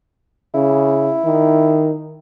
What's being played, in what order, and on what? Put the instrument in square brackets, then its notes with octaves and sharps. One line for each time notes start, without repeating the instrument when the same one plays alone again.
[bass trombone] C#3 [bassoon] E4
[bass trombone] D#3